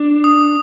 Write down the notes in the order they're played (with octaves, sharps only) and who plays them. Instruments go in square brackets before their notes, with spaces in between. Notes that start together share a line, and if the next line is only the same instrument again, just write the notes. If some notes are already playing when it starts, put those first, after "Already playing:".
Already playing: [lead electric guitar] D4
[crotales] D#6